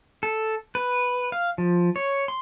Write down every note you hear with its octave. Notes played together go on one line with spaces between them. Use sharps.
A4
B4
F5
F3
C#5
C6